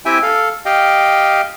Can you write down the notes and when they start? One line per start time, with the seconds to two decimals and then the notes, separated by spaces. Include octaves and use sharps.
0.05 C4 E4 G4 E5 G5 G#5
0.23 A4 F5
0.66 G4 D#5 F5 G5